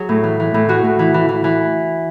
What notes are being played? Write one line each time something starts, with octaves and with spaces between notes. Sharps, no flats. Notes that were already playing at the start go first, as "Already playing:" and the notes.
Already playing: F#3 G#4
A2
E3
E3
A2
E3 F#4
A2
E3
E3
E3
E3